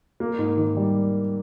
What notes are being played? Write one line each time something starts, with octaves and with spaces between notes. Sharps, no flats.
A#3
G#2
D#3
G3